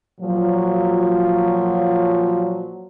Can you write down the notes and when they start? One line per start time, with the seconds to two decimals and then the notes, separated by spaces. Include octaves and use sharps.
0.20 A#2 F3 F#3